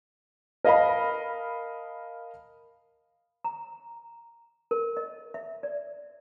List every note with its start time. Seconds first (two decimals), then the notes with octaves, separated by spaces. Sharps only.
0.65 A#4 D#5 F5 A5 B5
3.44 A#5
4.71 A#4
4.97 D#5
5.34 E5
5.63 D5